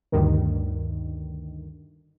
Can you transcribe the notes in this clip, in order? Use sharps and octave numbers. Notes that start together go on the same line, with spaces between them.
D2 G2 D#3